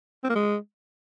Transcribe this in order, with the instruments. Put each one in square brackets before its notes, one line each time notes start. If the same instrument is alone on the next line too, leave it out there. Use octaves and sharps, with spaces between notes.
[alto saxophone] C4
A#3
G#3